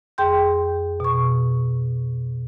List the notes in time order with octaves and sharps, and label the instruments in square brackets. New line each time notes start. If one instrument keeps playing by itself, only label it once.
[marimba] F2 G#4 G5 C6 G6
B2 C#6